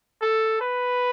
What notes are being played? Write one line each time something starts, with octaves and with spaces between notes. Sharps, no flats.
A4
B4